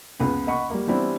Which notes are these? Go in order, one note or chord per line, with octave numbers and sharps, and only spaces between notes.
C#2 B3
D#5 F#5 B5 C#6
G3 A#3
E3 G3 B3 C4 D4 E4